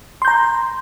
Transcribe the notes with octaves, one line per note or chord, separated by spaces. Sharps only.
A#5 C6 G6